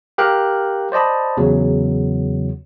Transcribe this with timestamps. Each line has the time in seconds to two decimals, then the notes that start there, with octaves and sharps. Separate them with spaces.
0.18 G4 A#4 F5 G5 A#5 F#6
0.92 C5 D5 D#5 A5 B5
1.37 E2 C#3 F#3